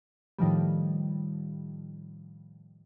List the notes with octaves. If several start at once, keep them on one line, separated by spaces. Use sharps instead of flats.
A2 D#3 F3 G3